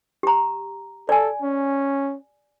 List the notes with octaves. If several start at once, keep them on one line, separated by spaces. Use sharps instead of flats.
G4 A#5
A4 D5 G#5
C#4